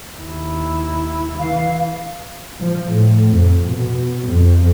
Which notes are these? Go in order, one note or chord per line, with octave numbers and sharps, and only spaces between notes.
D#2 E4
E3 F5
F3
A2
F2
B2
F2